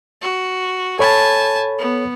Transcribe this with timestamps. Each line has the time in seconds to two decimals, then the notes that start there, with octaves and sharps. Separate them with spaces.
0.22 F#4
0.99 A4 C#5 G#5 A5 B5
1.78 B3